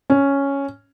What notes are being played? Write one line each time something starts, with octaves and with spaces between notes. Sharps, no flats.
C#4